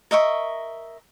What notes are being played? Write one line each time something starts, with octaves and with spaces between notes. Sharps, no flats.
A#4 D#5 E5 C#6